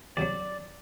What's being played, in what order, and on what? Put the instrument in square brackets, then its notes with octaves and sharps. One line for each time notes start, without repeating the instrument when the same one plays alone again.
[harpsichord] C#2 B2 F#3 [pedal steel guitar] D5